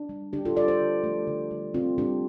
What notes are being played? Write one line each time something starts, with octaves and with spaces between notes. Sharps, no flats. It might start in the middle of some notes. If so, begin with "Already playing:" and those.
Already playing: D4
G3
D3 D4 G4
F4 A4
G3 A4 D5
G4 C5
D3
F3 A3
D3
G3
D3 C4 F4
G3 D4 G4